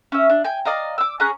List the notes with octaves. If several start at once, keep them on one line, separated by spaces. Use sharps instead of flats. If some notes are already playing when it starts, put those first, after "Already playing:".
C#4 E5
D4
G5 G#5
D5 D#5 F5 A#5
D6 E6
C#4 G#4 A#5 F#6